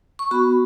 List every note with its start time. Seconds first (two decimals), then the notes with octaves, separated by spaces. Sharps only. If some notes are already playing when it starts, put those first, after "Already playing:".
0.19 C#6
0.31 B3 F#4 B5